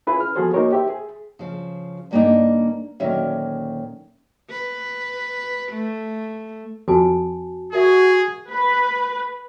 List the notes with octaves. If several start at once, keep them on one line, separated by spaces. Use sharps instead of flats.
C#4 E4 F4 G#4 B4
F6
F3 B3 F#4 G#4 A4 C5
A#3 D#4 F#4 G#4 A#4 C#5
G4 C5 E5
G#4
C#3 F3
G2 C#3 A#3 B3 D4 D#4
D2 A#2 D#3 F#3 C#4 E5
B4
A3
F2 F#4 G#5 A5
F#4 G#4 A#4 E5
B4